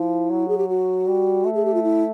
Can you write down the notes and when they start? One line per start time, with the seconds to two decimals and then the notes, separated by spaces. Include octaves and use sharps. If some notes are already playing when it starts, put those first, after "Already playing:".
Already playing: F3 E4
0.30 F#3
0.48 G#4
0.58 G4
0.69 F#4
1.07 G3
1.46 A3
1.55 G#4
1.65 G4
1.74 F4
1.83 E4